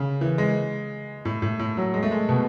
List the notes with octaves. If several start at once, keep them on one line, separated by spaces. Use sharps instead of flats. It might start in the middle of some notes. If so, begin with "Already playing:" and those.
Already playing: C#3
E3
G#3
A2
A2
A2
F#3
G#3
A3
G#3
B2